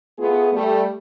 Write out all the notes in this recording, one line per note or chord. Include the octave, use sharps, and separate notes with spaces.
A3 B3 F4 G#4
G3 A3